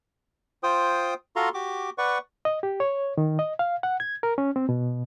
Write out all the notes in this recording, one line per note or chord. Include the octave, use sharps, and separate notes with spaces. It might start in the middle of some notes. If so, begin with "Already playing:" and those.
F4 C5 G5 D#6
F4 F#4 A4 F5 A#5 C6
F#4 G4 D6
B4 D5 F#5 C#6
D#5
G4
C#5
D#3
D#5
F5
F#5
G#6
A#4
C#4
C4
B2